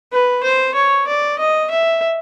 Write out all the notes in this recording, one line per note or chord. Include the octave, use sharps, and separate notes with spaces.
B4
C5
C#5
D5
D#5
E5